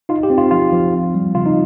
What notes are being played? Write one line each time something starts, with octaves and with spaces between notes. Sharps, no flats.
D#4 F4
G4
C4
F4
F3 F4
F3
C4
G3
C#3 F4
D#4